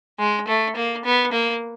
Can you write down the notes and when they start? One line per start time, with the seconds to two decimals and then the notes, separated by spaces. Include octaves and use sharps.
0.19 G#3
0.48 A3
0.76 A#3
1.05 B3
1.32 A#3